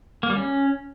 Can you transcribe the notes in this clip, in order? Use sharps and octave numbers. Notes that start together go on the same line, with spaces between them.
A#3
G3
C#4